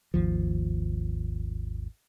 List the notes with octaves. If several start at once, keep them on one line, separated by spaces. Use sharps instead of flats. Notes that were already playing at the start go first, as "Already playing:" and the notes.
G#1 D#2 F3